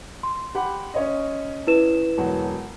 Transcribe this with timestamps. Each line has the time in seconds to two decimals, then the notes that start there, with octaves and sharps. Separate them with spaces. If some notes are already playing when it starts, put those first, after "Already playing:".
0.23 C6
0.55 G4 F#5 B5
0.94 C#4 C#5 D#5
1.67 E4 B4 E7
2.18 E1 F#3 F#4